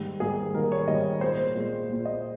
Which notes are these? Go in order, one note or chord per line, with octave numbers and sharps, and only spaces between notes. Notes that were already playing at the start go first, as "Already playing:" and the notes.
Already playing: G#2 D#3 G3 A#3
G#2 D#3 G3 A#3 G#4
G#2 D#3 G3 A#3 A#4
C#5
G#2 D#3 G3 A#3 D#5
A#2 G#3 C5
A#2 G#3
A#2 G#3
D#5